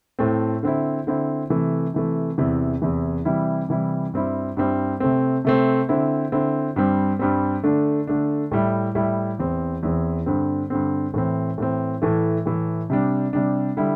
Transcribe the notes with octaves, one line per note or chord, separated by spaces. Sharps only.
A2 A3 C4
D3 C4 E4
D3 C4 E4
C3 E3 A3
C3 E3 A3
E2 C3 E3
E2 C3 E3
C3 E3 G3 E4
C3 E3 G3 E4
G2 G3 C4 E4
G2 G3 C4 E4
C3 A3 C4
C3 A3 C4
D3 C4 E4
D3 C4 E4
G2 G3 C4
G2 G3 C4
D3 A3 D4
D3 A3 D4
A2 G3 E4
A2 G3 E4
E2 E3 C4
E2 E3 C4
G2 D3 C4
G2 D3 C4
A2 E3 C4
A2 E3 C4
A2 E3 A3
A2 E3 A3
C3 G3 D4
C3 G3 D4
D3 G3 E4